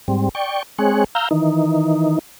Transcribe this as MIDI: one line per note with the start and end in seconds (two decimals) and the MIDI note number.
0.08 0.29 44
0.08 0.29 55
0.08 0.29 60
0.35 0.63 74
0.35 0.63 79
0.35 0.63 85
0.79 1.04 56
0.79 1.04 60
0.79 1.04 68
0.79 1.04 73
0.79 1.04 90
1.15 1.29 77
1.15 1.29 82
1.15 1.29 88
1.15 1.29 89
1.15 1.29 91
1.31 2.19 51
1.31 2.19 52
1.31 2.19 63